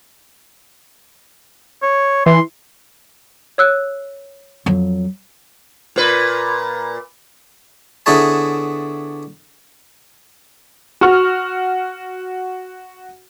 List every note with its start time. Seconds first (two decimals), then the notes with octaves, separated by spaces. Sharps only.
1.82 C#5
2.26 E3 C6
3.58 C#5 E6 F#6
4.66 F2 F#3
5.96 A#2 B4
8.06 D3 B3 E4 G#4 C#5 A5
11.01 F#4 C#6 F6